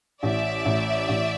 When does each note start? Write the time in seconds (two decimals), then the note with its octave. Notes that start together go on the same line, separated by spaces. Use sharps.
0.23 A1 D5 E5
0.65 A1
1.09 A1